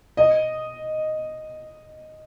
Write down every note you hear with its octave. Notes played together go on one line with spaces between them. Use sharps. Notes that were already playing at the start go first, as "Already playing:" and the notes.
D#5